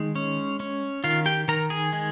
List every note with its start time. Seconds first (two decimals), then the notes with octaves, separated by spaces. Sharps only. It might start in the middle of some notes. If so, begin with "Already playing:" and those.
Already playing: D#3 G#3 D#4
0.16 C#4
0.60 C#4
1.04 D#3 F4 F5
1.26 G4 G5
1.48 D#3 A#4 A#5
1.70 G#4 G#5
1.93 G#3